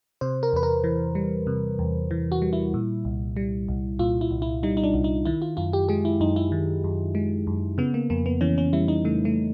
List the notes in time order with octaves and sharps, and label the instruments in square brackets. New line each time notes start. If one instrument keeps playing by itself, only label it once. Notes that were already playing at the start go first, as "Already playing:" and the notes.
[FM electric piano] C3 C5
A#4
E2 B4
A#4
E3
G3
C3
E2
E3
F#4
G3
E4
A#2
C2
G3
C2
A#2 F4
E4
C2
E4
G3 D#4
D#4
D4
C2
D#4
D#3 E4
F4
F#2 F4
G4
G#3 G#4
E4
F#2 D#4
E4
D#3
F#2
G#3
F#2
C#3 B3
A#3
F2 A#3
B3
E3 C#4
C#4
G3 E4
D#4
C#3 A3
A3